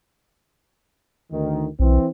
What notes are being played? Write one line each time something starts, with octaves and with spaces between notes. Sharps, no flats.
D2 D#3
B1 E3 C4